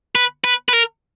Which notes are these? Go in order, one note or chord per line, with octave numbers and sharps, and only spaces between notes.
B4
B4
B4
A#4